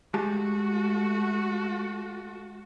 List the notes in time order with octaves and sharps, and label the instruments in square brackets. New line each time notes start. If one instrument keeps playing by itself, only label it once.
[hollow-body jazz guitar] G#3 G4 A5 [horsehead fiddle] A3 F#4